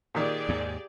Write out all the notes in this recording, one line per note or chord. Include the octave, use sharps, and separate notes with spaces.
A#2 D#3 G4 G#4 D5
D#2 G#2